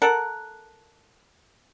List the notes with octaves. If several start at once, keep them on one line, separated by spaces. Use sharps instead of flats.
A4 A#4 F#5